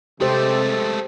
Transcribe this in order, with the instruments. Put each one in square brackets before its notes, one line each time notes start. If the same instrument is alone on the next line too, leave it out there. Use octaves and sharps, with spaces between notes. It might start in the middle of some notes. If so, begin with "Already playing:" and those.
[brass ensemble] C3 [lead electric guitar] G#3 A3 [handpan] G4 C5 [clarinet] A4